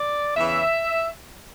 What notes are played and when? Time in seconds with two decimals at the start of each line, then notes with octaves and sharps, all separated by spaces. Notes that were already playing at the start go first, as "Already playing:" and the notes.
Already playing: D5
0.36 E2 C#3 E3 E5